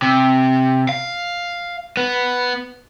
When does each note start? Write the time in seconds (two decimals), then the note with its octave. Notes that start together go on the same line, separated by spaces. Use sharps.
0.02 C3
0.89 F5
1.97 B3